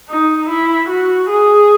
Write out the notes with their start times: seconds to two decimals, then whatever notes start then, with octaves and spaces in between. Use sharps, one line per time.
0.09 D#4
0.49 E4
0.89 F#4
1.30 G#4